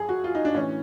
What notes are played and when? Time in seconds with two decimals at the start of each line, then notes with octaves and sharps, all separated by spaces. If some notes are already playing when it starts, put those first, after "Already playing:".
Already playing: F#2 F3 G#4
0.09 F#4
0.24 F4
0.35 D#4
0.45 D4
0.54 A2 E3 C#4